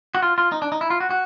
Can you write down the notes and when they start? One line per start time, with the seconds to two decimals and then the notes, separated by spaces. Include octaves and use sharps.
0.15 F#4
0.22 F4
0.38 F4
0.52 D#4
0.62 D4
0.72 D#4
0.81 E4
0.90 F4
1.00 F#4
1.10 F#4